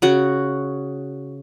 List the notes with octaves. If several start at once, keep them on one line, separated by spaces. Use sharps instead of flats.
C#3 F#4